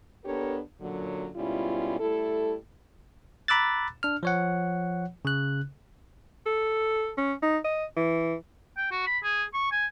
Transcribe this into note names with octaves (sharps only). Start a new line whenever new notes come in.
B3 D4 G4 A4 A#4 C#5
F#2 A#2 D3 F#3
G#2 B2 G3 C#4 E4 F4
G3 A3 E4 A4
A#5 B5 D6 E6 F#6 A6
D4 F6
F3 C#5 F#5
C#3 F#6
A4
C#4
D#4
D#5
E3
G5
F#4
B5
G#4
C#6
G#5